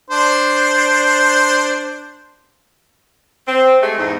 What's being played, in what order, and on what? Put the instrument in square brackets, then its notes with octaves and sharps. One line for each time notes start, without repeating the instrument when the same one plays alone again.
[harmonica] D4 C5
[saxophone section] C4
G#3 A3 G4 G#4
E2 G#2 D#4